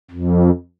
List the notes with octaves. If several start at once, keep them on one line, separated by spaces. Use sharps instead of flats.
F2